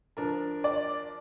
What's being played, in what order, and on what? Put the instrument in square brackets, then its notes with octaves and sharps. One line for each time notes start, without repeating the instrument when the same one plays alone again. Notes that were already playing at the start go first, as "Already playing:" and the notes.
[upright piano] F3 D4 A#4
[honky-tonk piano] D5